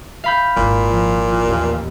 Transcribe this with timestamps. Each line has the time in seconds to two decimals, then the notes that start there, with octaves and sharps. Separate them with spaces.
0.24 F5 B5 G6
0.57 G#1 A#2 E4
0.89 F3
1.45 A1 D#2